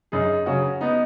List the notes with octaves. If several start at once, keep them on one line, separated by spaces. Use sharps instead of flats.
F#2 D#4 G#4
C#3 F#3 C#4 F#4
B3 D#4